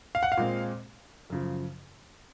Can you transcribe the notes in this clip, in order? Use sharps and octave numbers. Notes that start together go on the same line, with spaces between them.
F5
F#5
F5
A#2 G#3 C4
F#2 C#3 F3